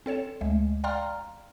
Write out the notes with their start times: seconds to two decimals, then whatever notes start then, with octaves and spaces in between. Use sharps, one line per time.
0.06 C4 A4 C#5 E7
0.41 D2 G#3 A3
0.84 D5 F5 G5 A#5 C6 F6